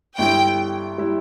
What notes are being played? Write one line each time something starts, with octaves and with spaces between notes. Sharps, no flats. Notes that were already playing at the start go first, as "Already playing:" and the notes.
G1 G2 G3 E4 G5
G3 E4